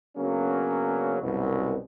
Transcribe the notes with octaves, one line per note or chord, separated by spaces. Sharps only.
C#3 F#3 A#3 B3 C#4 D4
C2 F#2 B2